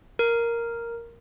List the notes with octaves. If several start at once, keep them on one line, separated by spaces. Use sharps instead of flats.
A#4